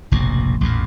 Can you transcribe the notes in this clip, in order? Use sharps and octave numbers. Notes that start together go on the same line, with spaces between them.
F1 A#1 G#2 B2
A1 E2 A#2